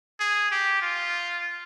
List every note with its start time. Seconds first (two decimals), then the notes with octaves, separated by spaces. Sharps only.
0.20 G#4
0.51 G4
0.82 F4